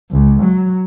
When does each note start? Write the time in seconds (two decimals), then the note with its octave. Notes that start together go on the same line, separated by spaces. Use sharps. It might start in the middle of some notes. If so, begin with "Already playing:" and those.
0.11 C#2
0.43 F#3